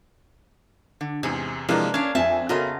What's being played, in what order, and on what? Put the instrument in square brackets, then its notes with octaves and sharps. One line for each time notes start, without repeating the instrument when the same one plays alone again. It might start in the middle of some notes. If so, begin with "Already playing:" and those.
[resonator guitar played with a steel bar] D3
[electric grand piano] E2 C3 [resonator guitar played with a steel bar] G#2 [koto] G#4
[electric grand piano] C3 G#3 [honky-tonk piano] E3 [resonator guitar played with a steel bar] F3 [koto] A#3 D4
[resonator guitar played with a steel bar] C#4 D4 [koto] F5 [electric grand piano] G#6
[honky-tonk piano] F2 G#5 [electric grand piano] C4 [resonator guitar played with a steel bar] E5 [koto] A5
[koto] C#3 F4 D#5 [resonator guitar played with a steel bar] B3 [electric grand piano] C#4 [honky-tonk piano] F#4 A4 A#4